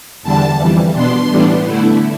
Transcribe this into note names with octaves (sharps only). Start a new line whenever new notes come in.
E2 D3 G3 D4 A5
F2 E3 G3
B2 B3 D4 C6
A2 E3 G3 B3 D4
D3 A3 E4